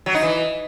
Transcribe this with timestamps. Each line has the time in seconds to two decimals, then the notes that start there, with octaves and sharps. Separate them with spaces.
0.06 F#3
0.14 D#4
0.23 E3